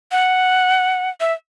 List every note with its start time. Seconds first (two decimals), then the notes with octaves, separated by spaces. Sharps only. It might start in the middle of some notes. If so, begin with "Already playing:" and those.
0.12 F#5
1.20 E5